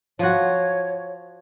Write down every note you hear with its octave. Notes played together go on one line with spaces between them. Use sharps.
F3 F#4 C#5